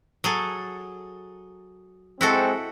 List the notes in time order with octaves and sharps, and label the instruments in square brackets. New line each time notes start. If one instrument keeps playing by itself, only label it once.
[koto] F#3 G#4 A4
[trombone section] G#3 C4 [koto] E4 F#4 A4